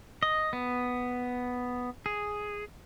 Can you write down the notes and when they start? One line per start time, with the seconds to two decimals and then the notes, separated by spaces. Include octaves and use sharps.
0.23 D#5
0.53 B3
2.06 G#4